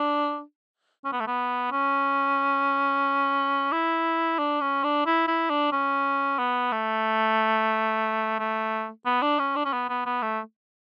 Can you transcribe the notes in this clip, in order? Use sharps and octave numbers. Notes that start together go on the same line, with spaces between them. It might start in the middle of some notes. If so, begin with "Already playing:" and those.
Already playing: D4
C#4
B3
A3
B3
C#4
E4
D4
C#4
D4
E4
E4
D4
C#4
B3
A3
A3
B3
D4
C#4
D4
C#4
B3
B3
B3
A3